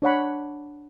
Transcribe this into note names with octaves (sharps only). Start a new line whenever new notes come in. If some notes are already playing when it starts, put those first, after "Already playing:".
D4 C#5 F#5 B5